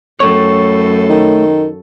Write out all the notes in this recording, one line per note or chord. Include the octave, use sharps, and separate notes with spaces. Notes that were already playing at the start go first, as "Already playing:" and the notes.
F#2 A3 A4 C#5
D#3